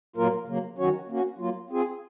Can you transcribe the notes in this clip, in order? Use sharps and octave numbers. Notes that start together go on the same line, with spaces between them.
A#2 F#3 A#3 F4 A#4
C#3 F#3 A#3
D#3 F#3 C#4 F#4 C#5
A#3 C#4 F#4
F#3 A#3 F4
C4 F4 G#4